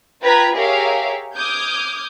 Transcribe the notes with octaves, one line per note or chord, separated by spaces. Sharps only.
F4 B4 G5 A#5 G#6 B6
G4 G#4 A#4 C#5 E5 F5
D6 D#6 F6 G6 G#6